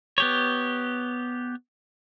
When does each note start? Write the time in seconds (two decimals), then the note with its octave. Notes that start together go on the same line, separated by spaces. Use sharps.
0.18 B3 G4 C#5